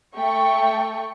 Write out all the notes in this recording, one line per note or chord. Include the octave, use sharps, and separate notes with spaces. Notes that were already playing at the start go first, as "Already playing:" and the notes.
A3 G5 C#6